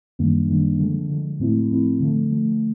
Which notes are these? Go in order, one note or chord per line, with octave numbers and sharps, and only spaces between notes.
F#2 D#3 G3 A#3 D4
F#2 D#3 G3 A#3 D4
D3 F3 G#3
D3 F3 G#3
A2 F3 A3 C4 E4
A2 F3 A3 C4 E4
D3 F3 A3
D3 F3 A3